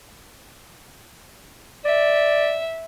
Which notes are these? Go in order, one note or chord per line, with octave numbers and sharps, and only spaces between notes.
D5 E5